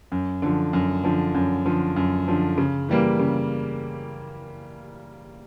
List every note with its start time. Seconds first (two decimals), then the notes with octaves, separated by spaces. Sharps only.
0.12 F#2
0.42 D3 F3
0.73 F#2
1.04 D3 F3
1.35 F#2
1.65 D3 F3
1.96 F#2
2.28 D3 F3
2.58 C#3
2.89 E3 G3 A#3
3.19 C#3